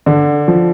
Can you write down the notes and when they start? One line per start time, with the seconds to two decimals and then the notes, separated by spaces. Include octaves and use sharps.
0.06 D3
0.48 F3